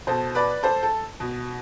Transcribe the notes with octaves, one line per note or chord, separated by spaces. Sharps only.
B2 A4 C5
B4 D5
A4 C5
A4
B2